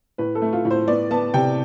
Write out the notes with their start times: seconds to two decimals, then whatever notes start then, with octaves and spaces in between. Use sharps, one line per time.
0.18 A2 B4
0.35 A4
0.42 A3
0.53 F4
0.65 A2
0.71 C5
0.88 B3 D5
1.11 B3 A5
1.34 C3 G5